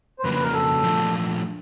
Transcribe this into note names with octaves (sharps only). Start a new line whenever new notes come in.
C5
F2 C#3 F#3 A#3 D4 B4
B4
A#4
A4
A#2 F3 A3 D4